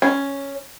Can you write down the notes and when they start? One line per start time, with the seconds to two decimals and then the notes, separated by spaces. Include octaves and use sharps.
0.02 C#4